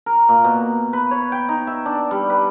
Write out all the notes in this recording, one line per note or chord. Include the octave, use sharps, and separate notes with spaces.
A#4
A#2
B2
B4
C#5
G5
D#4
E5
D4
G3
B4